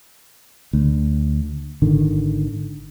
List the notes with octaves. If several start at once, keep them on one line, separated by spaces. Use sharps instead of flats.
D2
G#1 D3 D#3